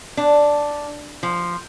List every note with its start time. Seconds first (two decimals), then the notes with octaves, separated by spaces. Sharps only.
0.17 D4
1.23 F3